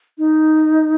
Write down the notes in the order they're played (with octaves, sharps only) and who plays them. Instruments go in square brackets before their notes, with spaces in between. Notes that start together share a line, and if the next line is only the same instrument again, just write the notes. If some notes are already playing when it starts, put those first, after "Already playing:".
[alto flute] D#4